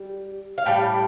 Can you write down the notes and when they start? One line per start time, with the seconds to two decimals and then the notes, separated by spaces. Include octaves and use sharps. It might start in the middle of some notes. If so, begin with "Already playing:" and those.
Already playing: G3
0.58 F5
0.66 A2 G3 G5